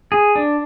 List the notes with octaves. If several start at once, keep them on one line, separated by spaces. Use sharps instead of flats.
G#4
D4